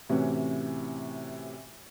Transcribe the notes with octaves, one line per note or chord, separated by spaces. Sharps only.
A2 C3 E3 C#4 F#4